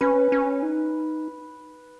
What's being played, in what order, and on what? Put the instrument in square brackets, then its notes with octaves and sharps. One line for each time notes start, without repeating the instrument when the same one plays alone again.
[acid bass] C#4 [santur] B4
[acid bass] C#4
D#4